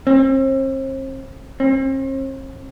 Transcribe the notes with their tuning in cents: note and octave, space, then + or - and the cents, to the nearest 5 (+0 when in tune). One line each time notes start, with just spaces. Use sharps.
C4 +40
C4 +45